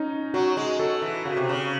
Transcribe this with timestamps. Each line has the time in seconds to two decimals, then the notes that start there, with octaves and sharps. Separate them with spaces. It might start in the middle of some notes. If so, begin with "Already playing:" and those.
Already playing: C#4 D#4
0.34 F#3 F#4
0.57 G#3
0.79 F#3 A4
1.02 E3
1.25 C#3 F#4
1.37 C3
1.49 C#3